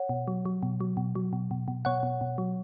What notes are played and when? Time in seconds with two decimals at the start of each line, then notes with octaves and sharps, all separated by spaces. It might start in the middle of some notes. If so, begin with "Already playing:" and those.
Already playing: C#5 F#5
0.09 B2
0.28 F#3
0.45 F#3
0.63 B2
0.81 F#3
0.97 B2
1.15 F#3
1.33 B2
1.51 B2
1.68 B2
1.85 B2 C#5 F#5
2.03 B2
2.21 B2
2.38 F#3